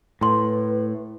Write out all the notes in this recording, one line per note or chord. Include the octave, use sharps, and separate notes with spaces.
A2 B4 A5 C6